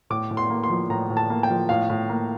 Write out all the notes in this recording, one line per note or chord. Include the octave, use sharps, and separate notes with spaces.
A2 D6
A2
C6
A#3
C6
F3
A2 A#5
A2
A5
A#3
G5
F3
A2 F5
A2
A#3